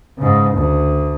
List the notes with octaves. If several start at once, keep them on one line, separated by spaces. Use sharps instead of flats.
G#2 C#3
D2